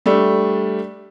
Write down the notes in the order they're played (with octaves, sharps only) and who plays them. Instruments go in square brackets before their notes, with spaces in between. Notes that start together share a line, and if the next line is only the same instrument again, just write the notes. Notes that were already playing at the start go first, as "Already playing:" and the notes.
[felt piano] G3 A3 D4